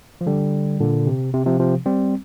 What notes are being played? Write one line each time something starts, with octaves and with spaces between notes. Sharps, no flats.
F3
D3 G3
A#2 D3
C3
C3
C3 F3
C3 F3
G3 C4